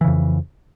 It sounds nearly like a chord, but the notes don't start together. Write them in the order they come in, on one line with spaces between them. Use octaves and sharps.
E3 C#3 F2